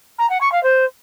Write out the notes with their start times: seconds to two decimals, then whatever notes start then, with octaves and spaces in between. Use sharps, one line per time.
0.18 A#5
0.29 F#5
0.40 C#6
0.51 F5
0.63 C5